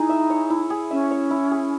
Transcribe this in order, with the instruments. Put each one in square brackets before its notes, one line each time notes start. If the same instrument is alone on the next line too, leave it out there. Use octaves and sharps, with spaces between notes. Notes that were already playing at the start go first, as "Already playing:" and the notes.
Already playing: [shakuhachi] D#4 [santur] E4 G#4
[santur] E5
C#5
E4
G#4
[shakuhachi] C#4 [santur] E5
[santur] C#5
E4
G#4